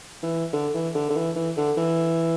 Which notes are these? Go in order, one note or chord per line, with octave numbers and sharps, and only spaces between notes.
E3
D3
E3
D3
D3
E3
E3
D3
E3